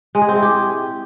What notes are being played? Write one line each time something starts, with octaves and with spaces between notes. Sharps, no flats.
G#3
G#4
C4
E4
G4